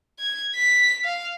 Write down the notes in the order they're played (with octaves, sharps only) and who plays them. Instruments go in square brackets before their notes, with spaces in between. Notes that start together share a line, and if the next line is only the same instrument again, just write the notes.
[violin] G#6
B6
F5